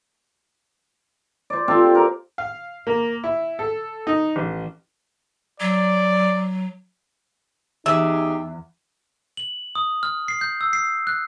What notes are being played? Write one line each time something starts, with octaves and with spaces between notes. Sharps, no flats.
C5 D5
C4 F4 G4 A4
A#4
F5
A#3
E4
A4
D#4
A1
F#3 D5
E2 D#4 G4 G#4 E5
F#7
D#6
F6
C7
G6
E6
C7
F#6